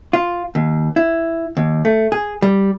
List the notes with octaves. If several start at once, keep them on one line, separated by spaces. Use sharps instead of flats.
F4
D#2
E4
D#2
A3
G#4
G3